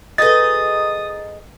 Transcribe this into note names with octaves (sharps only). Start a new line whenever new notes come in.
D#4 F#4 G#4 A4 B4 D#5 D#6 A6